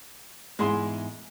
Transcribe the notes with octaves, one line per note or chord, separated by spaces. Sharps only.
E2 G#2 G#3 E4 G#4 C6